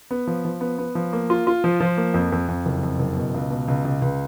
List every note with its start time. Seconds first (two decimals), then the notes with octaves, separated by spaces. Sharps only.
0.11 B3
0.27 F3
0.45 F3
0.61 B3
0.78 B3
0.95 F3
1.13 A#3
1.30 F4
1.47 F4
1.64 F3
1.80 F3
1.97 A#3
2.14 F2
2.32 F2
2.48 F2
2.66 F#1
2.83 F2
2.99 F#1
3.17 B2
3.34 C#2
3.50 B2
3.68 C#2
3.85 C#2
4.02 C#2